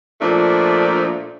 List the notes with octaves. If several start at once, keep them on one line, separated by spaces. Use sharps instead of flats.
A#2 F3 A3 D4